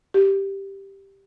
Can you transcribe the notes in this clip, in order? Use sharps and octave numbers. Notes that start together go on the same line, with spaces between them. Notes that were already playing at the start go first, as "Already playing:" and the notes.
G4